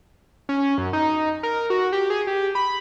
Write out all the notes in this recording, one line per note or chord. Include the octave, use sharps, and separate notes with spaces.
C#4
F#2
D#4
A#4
F#4
G4
G#4
G4
B5